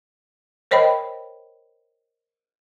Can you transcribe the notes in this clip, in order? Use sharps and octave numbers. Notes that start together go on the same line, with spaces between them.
A#4 C5 C#5 D#5 G5 B5